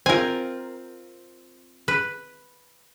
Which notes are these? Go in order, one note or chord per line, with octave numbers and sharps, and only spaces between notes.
C4 F4 A#4 G#5
B4